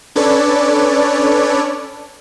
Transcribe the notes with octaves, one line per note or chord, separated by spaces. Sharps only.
C#4 D4 A4 B4 C#5 D5